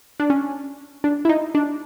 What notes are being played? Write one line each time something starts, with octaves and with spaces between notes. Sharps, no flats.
D4
C#4
D4
E4
D#4
D4